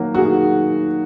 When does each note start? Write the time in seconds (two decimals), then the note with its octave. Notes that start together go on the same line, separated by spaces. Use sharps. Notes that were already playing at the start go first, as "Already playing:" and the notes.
Already playing: D#3 F#3 A#3
0.15 F#4
0.18 D#3 G#4